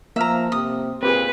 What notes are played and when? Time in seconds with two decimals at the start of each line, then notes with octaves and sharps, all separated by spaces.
0.16 F3 A#3 E5 A#5 F6
0.52 C3 D#6
1.03 A#2 C4 G4 G#4 B4